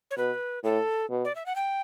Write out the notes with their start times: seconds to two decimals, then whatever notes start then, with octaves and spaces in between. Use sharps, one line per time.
0.11 C#5
0.17 B2 B4
0.64 A2 A4
1.10 B2
1.25 D5
1.35 E5
1.46 F#5
1.56 G5